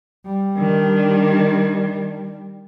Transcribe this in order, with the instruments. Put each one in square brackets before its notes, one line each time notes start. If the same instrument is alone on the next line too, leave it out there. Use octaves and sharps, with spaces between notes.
[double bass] G3
[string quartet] D#3 D4